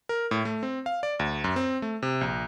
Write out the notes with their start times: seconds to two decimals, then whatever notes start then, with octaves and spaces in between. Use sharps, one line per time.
0.09 A#4
0.31 A2
0.45 A3
0.63 C4
0.86 F5
1.03 D5
1.19 D2
1.44 F#2
1.56 C4
1.82 A3
2.03 C3
2.21 A#1